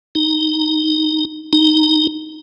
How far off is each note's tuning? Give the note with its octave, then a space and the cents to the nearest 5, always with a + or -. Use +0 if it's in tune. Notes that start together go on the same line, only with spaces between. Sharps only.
D#4 -5
D#4 -5